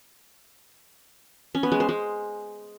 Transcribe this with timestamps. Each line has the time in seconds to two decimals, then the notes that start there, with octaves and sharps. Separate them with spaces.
1.55 C#4
1.63 B3
1.72 G#3
1.80 C5
1.89 G#3